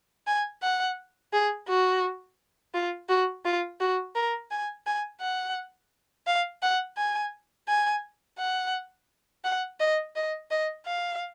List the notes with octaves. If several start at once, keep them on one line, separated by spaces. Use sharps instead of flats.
G#5
F#5
G#4
F#4
F4
F#4
F4
F#4
A#4
G#5
G#5
F#5
F5
F#5
G#5
G#5
F#5
F#5
D#5
D#5
D#5
F5